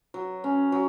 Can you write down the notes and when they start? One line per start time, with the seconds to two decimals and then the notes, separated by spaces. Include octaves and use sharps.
0.14 F#3
0.44 C#4
0.72 F#3